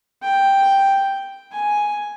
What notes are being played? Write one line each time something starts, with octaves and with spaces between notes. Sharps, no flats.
G5
G#5